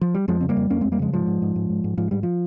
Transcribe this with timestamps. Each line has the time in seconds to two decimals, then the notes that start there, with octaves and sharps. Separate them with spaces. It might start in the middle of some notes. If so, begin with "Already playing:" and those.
0.01 F3
0.14 G3
0.28 F2 F3 G#3
0.41 C#3 C4
0.49 G3 A#3
0.57 F2
0.70 F2 A#3 C#4
0.81 F2 G#3 C4
0.92 G3 A#3
0.99 C#3 F3 G#3
1.13 G#2 F3 G#3
1.27 G#2
1.42 G#2
1.56 G#2
1.70 G#2
1.84 G#2
1.97 G#2 F3
2.11 G#2 G3
2.23 F3